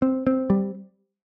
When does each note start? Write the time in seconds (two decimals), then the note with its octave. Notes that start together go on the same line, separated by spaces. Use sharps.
0.02 C4
0.27 C4
0.50 G3